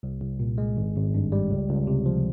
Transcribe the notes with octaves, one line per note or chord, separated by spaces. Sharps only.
C2
C2
A#2
G#3
G#1
G#1
G2
G3
C#2
C#2
C3
F3